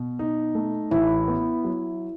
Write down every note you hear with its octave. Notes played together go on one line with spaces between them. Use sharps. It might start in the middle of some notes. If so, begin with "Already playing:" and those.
Already playing: B2
D#4
A3
A1 E4
B3
F#3